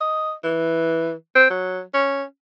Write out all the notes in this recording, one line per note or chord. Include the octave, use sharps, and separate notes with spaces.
D#5
E3
C4
F#3
C#4